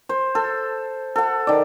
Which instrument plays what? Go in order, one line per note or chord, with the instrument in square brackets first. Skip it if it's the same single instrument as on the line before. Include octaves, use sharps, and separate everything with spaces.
[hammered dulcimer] C5
A4
A4 F#5
D#3 D5